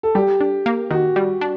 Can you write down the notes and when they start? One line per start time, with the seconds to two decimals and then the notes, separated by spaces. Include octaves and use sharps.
0.03 A4
0.15 G3 G4
0.41 D4
0.66 A#3
0.91 D#3 F#4
1.16 G3
1.41 D4